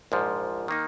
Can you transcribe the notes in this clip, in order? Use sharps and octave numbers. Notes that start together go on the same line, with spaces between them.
A#1 G#2 F3
D#3 A#3 D#4